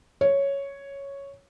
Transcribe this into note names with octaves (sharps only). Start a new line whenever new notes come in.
C#5